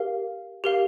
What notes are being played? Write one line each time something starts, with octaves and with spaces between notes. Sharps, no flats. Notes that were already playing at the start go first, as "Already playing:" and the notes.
Already playing: G4 A#4 F5
G4 A#4 F5